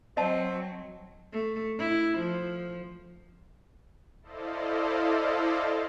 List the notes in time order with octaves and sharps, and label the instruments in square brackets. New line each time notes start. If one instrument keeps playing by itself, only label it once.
[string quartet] F#3 [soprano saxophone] C4 [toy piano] D#5 A5
[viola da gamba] A3
E4
F3
[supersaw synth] E4 A4 C5 D5 D#5 F5